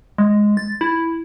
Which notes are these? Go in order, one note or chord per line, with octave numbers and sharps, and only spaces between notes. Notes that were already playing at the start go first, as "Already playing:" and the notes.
G#3
A6
E4